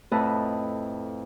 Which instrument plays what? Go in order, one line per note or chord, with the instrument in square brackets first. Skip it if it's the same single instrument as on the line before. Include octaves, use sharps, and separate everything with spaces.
[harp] F2 A2 E4 B4 D#5 A5